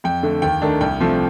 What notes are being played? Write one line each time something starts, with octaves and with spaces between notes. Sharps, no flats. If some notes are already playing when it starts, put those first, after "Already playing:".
F2 G5
D3 A3
D#2 G5
D#3 A3 D4
C2 G5
C3 F3 A3